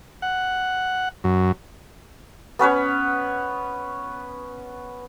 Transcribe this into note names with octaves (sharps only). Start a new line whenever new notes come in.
F#5
F#2
B3 C#4 B4 C#5